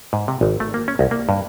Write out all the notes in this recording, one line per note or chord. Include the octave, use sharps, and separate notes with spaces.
G#2
C3
G#1
A3
A#3
C#4
C2
A#3
G2